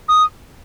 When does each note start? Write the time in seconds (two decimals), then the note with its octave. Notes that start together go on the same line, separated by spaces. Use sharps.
0.09 D#6